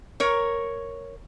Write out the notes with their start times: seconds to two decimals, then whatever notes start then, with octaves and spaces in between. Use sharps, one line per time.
0.20 A#4 C#5